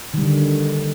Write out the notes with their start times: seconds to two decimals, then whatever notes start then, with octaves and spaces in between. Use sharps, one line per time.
0.14 D#3
0.18 G3
0.22 D3